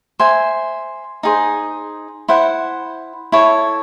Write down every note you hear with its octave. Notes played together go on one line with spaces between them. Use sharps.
C5 E5 G#5
D#4 G#4 C5
E4 C5 F#5
E4 A4 C#5